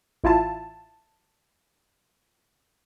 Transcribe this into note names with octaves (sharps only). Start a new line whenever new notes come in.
A1 E4 F4 A5